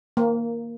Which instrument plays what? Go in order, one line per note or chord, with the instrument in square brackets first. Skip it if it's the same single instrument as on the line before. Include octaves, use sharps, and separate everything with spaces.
[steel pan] A#3